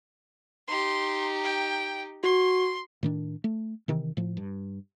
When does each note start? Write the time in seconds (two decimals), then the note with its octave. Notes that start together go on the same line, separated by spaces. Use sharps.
0.68 D#4 G4 C6
1.44 G5
2.24 F#4 C6
3.03 A2 D#3 D4
3.44 A3
3.88 C3 D#3 E3
4.17 A2 F3
4.37 G2